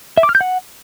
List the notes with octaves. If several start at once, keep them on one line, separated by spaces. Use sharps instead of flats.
E5
D6
F6
G6
F#5